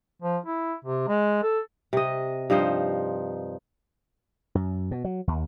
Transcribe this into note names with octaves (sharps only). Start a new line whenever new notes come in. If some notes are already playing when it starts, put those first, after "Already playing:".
F3
E4
C3
G#3
A4
C3 D#5
G2 F3 D#4 C5
F#2
B2
F#3
D#2